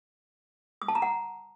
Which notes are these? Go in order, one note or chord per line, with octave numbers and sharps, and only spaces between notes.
D#6
A5
A#5
F#5